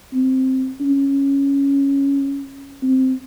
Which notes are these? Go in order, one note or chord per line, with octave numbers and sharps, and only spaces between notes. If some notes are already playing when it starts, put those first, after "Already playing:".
C4
C#4
C4